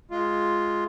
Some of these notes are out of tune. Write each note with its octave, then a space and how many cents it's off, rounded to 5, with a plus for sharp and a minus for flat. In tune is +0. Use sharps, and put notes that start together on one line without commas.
G#3 +10 F4 +0